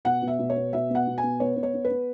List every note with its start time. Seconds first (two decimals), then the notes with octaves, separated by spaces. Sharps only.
0.05 B2 F#5
0.22 B2
0.28 E5
0.39 B2
0.50 C#5
0.56 B3
0.73 B2 E5
0.90 B3
0.95 F#5
1.07 B2
1.18 G#5
1.23 B3
1.40 B3 C#5
1.56 B3
1.63 C#5
1.74 B3
1.85 B4
1.90 B3